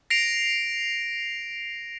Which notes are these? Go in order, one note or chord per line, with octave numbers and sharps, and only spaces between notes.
A#6 C7 D7 F7